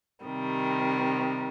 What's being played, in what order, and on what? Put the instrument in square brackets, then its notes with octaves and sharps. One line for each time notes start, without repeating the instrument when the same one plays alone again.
[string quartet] C3 D#3 G3